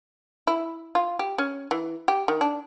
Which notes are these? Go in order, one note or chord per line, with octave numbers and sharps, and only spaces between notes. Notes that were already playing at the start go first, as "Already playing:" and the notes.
E4
F4
G4
C#4
E3
G4
D#3
D4